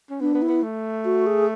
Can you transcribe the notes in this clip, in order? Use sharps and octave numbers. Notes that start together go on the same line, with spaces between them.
C#4
B3 D4
B3
E4
B3
A3
F#4
G#4